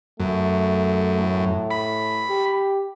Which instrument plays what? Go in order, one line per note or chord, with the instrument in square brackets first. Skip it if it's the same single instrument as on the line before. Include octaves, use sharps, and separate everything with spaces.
[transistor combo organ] F#2 [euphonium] A3
[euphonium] A2
[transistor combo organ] B5
[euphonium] G4